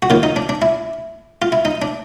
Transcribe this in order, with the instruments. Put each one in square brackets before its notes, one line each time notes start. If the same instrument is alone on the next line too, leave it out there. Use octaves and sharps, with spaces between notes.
[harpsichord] F#4
D#2 D#3 F4
D#4
D4
D4
E4
F4
E4
D#4
D4